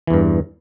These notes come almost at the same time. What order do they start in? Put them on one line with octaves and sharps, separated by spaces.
E3 E2 G2